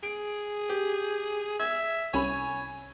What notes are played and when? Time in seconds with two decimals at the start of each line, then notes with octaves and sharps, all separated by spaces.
0.03 G#4 D7
0.69 G4
1.60 E5 G#6
2.14 C2 C#4 C#5 G#5 B5